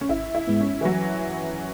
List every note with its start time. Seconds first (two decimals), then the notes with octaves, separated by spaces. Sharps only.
0.01 C#4
0.09 G#1 E4
0.35 E4
0.47 G#2 G#3 B3 E4
0.60 C#4
0.81 E3
0.85 F#3